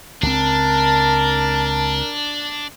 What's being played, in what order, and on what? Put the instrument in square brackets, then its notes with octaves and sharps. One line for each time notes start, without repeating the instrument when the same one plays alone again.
[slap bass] C#2 C#3 C4 [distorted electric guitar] D4 [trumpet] A#4 [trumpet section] A5